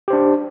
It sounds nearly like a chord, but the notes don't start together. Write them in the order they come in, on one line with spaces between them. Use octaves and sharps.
G4 C5 D4